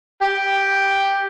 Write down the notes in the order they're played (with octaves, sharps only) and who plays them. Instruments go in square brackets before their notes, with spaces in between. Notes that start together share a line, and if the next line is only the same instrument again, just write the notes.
[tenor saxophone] G4